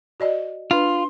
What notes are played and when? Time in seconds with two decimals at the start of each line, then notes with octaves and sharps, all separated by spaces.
0.20 F#4 D5 D#5
0.71 D4 F4 B4 C6